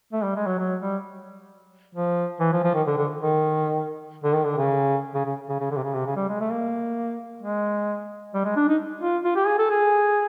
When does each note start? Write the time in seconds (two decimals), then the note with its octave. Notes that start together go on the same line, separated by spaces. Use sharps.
0.13 A3
0.23 G3
0.36 G#3
0.46 F#3
0.58 F#3
0.80 G3
1.95 F3
2.40 E3
2.52 F3
2.64 F3
2.74 D#3
2.87 D3
2.98 D3
3.21 D#3
4.24 D3
4.34 D#3
4.45 D3
4.57 C#3
5.14 C#3
5.26 C#3
5.49 C#3
5.60 C#3
5.71 D3
5.77 C3
5.83 C#3
5.94 C3
6.06 C#3
6.16 G3
6.28 G#3
6.40 A3
6.51 A#3
7.42 G#3
8.34 G3
8.45 G#3
8.56 D4
8.68 D#4
9.01 F4
9.24 F4
9.36 G4
9.47 G#4
9.59 A4
9.70 G#4